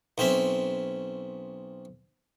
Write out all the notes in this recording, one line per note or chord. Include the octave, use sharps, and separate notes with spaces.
B1 C4 C#4 E5